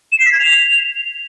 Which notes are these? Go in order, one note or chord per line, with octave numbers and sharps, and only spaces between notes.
E7
C7
B6
G#6
F7